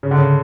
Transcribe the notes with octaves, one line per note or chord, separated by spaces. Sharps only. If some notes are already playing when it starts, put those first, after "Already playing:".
C#3
D3
C#3